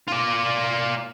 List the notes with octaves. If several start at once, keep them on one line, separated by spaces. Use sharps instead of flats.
F4 D5